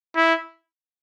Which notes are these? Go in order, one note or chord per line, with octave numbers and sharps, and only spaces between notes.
E4